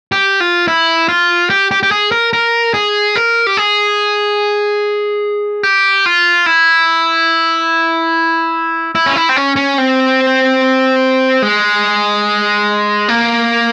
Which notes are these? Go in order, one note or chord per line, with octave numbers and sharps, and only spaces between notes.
G4
F4
E4
F4
G4
G4
G4
G#4
A#4
A#4
G#4
A#4
G4
G#4
G4
F4
E4
E4
C#4
E4
C4
C#4
C#4
C4
G#3
A#3